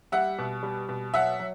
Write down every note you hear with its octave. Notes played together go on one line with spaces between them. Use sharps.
G3 E5 F#5
B2
G3
B2
F#3 E5 F#5
F#3